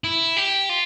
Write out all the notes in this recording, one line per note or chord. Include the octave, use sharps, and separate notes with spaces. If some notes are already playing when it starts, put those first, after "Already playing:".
E4
G4
F4